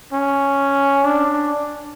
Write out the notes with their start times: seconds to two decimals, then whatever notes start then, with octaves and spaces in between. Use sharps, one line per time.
0.13 C#4
1.04 D4